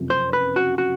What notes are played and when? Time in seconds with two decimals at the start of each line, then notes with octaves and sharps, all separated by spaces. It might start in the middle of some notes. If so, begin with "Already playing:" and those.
Already playing: F#1 F2 C3
0.10 C5
0.33 B4
0.56 F#4
0.78 F#4